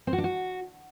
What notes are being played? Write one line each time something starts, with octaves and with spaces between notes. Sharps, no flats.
C4
F#4
D4
F#4